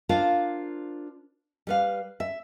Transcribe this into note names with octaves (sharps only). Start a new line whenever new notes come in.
D4 F4 A#4 C5 F5
G3 B4 F5
E5